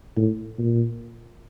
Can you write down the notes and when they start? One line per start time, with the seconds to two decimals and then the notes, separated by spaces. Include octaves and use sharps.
0.17 A2
0.58 A#2